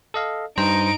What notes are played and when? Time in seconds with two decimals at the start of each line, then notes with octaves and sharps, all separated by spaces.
0.14 A4 D#5 F5
0.58 G2 D#4 C5 A#5 D7